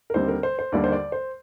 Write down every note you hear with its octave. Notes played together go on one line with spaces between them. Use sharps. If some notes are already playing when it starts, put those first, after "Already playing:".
A#4
D#2 D3 G3 C4 C5
A#4
C5
C5
D#2 D3 G3 A#3 D5
C5
D5
C5